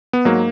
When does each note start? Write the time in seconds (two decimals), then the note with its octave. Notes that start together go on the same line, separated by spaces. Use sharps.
0.13 B3
0.25 G#2 F#3 A#3